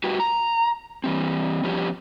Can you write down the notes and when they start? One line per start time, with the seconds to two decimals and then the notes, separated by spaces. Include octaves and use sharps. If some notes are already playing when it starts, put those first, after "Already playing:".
0.04 G3 F#4 G4 B4
0.20 A#5
1.04 E3 G3 C4
1.64 F3 G3 B3 C#4 G4